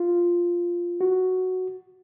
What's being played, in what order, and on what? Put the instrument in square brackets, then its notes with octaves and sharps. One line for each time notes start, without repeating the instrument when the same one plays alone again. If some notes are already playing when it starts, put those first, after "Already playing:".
Already playing: [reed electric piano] F4
F#4